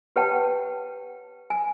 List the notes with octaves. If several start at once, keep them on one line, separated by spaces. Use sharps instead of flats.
G4 B4 C#5 F#5 G5 A5
G#5